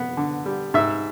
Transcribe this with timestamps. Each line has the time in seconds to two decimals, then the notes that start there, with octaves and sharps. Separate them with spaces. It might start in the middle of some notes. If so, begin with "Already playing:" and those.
Already playing: B3
0.17 D3
0.46 G3
0.74 G#2 E5